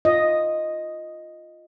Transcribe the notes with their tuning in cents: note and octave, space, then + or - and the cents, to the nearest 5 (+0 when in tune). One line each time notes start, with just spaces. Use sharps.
F4 +0 D#5 +0